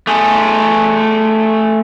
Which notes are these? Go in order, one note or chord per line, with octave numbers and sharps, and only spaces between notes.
A3 G#4